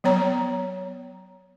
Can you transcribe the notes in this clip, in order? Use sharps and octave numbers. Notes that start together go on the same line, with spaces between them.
F#3 B3 C#5 A#5